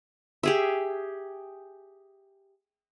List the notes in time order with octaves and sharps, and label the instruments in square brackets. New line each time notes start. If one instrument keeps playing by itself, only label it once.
[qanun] G4 G#4 E5